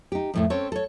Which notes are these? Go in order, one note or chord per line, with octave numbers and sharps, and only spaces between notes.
D#4 G4
F2 A2 A3
C4 C#4 A4 C#5
A4 C#5